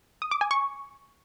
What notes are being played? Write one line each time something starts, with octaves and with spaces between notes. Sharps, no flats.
D#6
D6
G#5
C#6